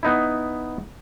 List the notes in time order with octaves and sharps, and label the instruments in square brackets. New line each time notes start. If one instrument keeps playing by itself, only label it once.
[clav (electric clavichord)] B3 D#4 E4